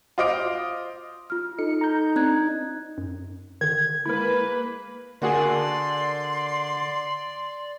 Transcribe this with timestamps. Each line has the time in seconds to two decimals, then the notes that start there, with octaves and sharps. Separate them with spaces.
0.18 F4 C5 D#5 D6 F6 D7
1.30 F4 F6
1.59 D#4 A4 C#7
1.81 A#5 G6
2.16 C4 D4 A#5 F#6 G#6
2.98 F#2
3.61 D3 D#3 G#6
4.06 G#3 A#3 E4 A#4 B4
5.22 D3 A#3 F#4 G#4 D5 C6